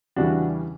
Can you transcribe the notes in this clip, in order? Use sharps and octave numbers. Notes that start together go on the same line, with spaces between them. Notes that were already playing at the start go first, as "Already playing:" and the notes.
E2 C#3 E3 G3 D4 F#4